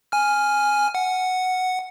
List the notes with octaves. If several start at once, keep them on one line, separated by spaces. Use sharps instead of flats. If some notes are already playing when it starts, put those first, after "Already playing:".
G#5 F6
F#5